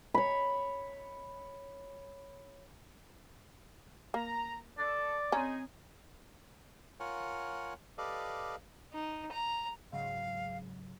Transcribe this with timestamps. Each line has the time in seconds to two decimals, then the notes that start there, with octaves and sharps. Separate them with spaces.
0.14 C#5 B5
4.14 A#3 A#5
4.78 A4 D5
5.32 C4 C#4 D#4 G#4 C#5 G#5 A#5
7.00 F4 A#4 C#5 F#5 G#5
7.98 G4 A4 B4 D5 D#5 F5
8.93 D#4
9.32 A#5
9.93 G#2 C#3 F#3 F5